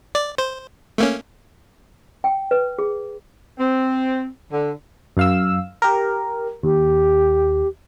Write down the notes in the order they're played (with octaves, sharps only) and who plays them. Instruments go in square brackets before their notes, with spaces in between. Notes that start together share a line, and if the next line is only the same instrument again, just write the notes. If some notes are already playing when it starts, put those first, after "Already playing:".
[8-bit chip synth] D5
C5
A3 A#3 C#4
[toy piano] G5
B4
G#4
[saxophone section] C4
D3
[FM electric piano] F#2 F5 E6
G4 A#4
[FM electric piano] D#2 [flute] G4